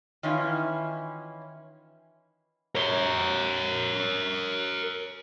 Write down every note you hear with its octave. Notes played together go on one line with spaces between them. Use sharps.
D#3 E3 C#4 E4 F4
A#4 C#5